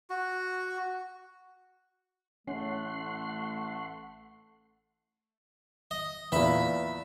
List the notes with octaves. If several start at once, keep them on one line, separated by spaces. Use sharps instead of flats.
F#4
A1 A3 C#4 F#5 C6
D#5
E2 A#2 B4 E5 B5